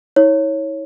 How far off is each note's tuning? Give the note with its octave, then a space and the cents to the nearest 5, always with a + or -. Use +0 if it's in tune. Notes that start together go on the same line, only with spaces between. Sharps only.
E4 -45 C#5 -10